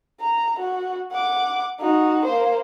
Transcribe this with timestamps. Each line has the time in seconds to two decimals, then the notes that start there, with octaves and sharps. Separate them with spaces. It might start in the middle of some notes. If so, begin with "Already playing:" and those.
0.21 A#5
0.60 F#4
1.12 F#5 D6
1.80 D#4 F#4
2.25 A#3 C5